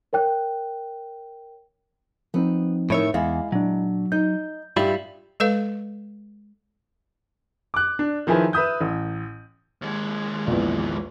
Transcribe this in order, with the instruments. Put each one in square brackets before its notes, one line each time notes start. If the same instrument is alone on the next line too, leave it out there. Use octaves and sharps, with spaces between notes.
[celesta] A#4 C#5 G5 F#6
[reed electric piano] F3 C4 D#4 [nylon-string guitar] B3
[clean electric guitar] A2 C#5 E5 [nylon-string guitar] D#3 E4
[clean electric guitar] E2 [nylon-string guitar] G#3 E4 [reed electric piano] F5
[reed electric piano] A#2 D4 [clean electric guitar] F#3
[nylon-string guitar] D#4 [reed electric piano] G6
[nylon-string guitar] G2 E3 G4 [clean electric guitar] G3 E4 F4
[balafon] G#3 A4 B4 F5
[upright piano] D6 F#6
D4
D#3 F3 E4 G#4 B4
B4 E5 D#6 G6
A1
[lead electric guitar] D#2 G#3
[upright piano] A#1 E2